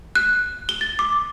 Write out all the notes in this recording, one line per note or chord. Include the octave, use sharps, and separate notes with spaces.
F#6
G7
A6
D6